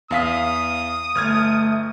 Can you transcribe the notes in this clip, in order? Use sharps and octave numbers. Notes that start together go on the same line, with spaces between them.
E2 F5 D#6 B6
G1 A3 F6 G#6